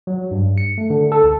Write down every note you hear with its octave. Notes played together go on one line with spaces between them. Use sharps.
F#3
G2
C#7
A3
D3
A4
C#2